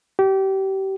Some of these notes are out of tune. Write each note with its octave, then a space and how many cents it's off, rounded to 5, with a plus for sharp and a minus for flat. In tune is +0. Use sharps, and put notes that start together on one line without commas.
G4 -30